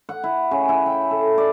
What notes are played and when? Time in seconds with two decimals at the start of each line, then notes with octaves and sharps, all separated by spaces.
0.09 F#5
0.24 E4
0.51 C#3
0.69 E4
0.86 G5
1.11 A4
1.38 D5